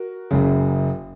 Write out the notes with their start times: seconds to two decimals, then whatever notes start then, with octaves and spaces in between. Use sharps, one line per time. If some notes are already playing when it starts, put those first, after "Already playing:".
Already playing: F#4 A#4
0.31 F#1 F#2 C#3